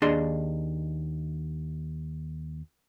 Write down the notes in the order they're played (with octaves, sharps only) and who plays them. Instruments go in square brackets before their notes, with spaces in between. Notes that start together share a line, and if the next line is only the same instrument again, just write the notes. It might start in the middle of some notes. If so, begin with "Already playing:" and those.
[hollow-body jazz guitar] D#2 D4 G#4 D#5 C6